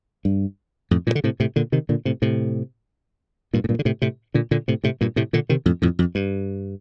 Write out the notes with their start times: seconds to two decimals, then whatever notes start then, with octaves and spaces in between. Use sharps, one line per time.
0.25 G2
0.91 F2 A2
1.07 G2 A#2
1.15 D3
1.24 A2 C3
1.40 A2 C3
1.56 A#2 D3
1.72 C3 D#3
1.89 A#2 D3
2.05 A2 C3
2.22 A2 C3
3.53 G2 A#2
3.64 A2
3.69 G2 A#2
3.79 D3
3.85 A2 C3
4.02 A2 C3
4.34 A#2 D3
4.51 A#2 D3
4.68 A2 C3
4.84 A2 C3
5.01 G2 A#2
5.16 A2 C3
5.33 A#2 D3
5.49 C3 D#3
5.66 F2 A2
5.82 F2 A2
5.99 F2
6.15 G2